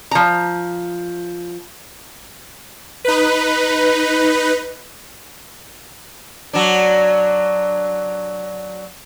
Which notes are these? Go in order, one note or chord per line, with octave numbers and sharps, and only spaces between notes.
F3 A#5
D#4 B4
F#3 D4